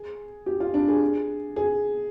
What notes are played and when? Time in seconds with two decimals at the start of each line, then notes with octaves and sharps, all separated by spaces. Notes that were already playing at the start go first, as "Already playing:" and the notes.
Already playing: G#4
0.46 G4
0.60 F4
0.74 D4
0.88 G#4
1.56 G#4